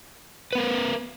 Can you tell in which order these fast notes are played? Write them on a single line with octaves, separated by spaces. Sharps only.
B4 B3 A#4